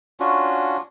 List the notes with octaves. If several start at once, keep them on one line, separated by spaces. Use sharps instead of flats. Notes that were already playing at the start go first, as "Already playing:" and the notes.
C#4 D4 F4 F#4